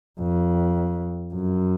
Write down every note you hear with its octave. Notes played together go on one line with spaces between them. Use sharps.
F2
F#2